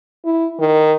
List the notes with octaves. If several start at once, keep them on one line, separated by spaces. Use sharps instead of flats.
E4
D#3